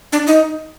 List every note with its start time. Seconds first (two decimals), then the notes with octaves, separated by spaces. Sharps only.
0.13 D4
0.27 D#4